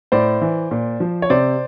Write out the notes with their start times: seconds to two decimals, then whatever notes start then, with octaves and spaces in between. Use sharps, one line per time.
0.12 A2 C5 D5
0.41 E3
0.71 A#2
1.00 F3
1.22 C#5
1.30 C3 C5 D5